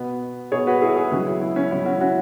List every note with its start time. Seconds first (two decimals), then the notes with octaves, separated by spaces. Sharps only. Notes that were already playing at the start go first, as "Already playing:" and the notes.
Already playing: B2 B3
0.52 B2 B3 G#4 C#5
0.67 F#4 B4
0.82 E4 G#4
0.96 E4 G#4
1.11 C#2 C#3 F#3 C#4 F#4
1.26 E4
1.41 E4
1.56 C#4
1.71 C#2 C#3 F#3 E4
1.86 C#4 F#4
2.00 C#4 F#4